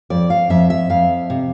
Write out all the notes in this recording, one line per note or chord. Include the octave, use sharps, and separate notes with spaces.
F2 D5
F5
F2 E5
E5
F2 F5
C3